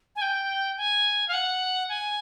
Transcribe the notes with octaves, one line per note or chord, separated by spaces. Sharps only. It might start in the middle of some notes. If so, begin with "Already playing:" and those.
G#5
G5
G#5
F5
F#5
G#5